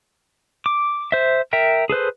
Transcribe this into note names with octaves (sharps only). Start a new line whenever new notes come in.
D6
C5 E5
A#4 E5 G5
G#4 A4 B4 C5